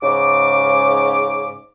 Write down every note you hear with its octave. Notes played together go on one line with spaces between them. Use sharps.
G#2 C#3 D6